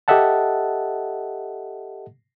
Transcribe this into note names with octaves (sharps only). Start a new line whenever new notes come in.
G4 A4 D#5 E5 F#5 A5